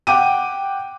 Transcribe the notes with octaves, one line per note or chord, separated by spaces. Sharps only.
F#5 G5 D6 D#7